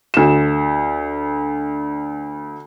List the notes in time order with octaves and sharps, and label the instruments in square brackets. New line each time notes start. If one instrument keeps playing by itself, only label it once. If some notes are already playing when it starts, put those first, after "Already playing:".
[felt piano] D2 E7